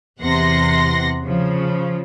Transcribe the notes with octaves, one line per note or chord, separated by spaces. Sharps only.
E2 C3 F#5 C6 A#6
C#3 F3